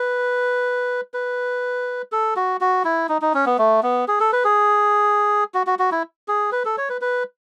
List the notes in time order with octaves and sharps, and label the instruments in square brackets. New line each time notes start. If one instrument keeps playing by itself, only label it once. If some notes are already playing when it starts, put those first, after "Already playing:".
Already playing: [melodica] B4
B4
A4
F#4
F#4
E4
D#4
D#4
C#4
B3
A3
B3
G#4
A4
B4
G#4
F#4
F#4
F#4
E4
G#4
B4
A4
C#5
B4
B4